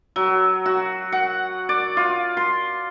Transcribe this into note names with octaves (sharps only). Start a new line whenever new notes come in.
F#3
F#4
F#5
D5
F4
C6